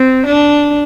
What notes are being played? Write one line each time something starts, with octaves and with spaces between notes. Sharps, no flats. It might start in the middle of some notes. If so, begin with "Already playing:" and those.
Already playing: C4
D4